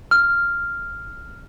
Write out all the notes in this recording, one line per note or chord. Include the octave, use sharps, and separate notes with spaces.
F6